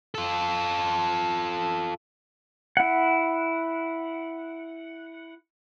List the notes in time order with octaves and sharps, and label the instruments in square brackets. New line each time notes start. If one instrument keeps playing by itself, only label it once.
[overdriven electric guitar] F4 A4
[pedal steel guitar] E4 F#5